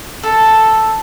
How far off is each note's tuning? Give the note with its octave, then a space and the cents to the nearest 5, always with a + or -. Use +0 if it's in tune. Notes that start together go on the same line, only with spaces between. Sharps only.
A4 +0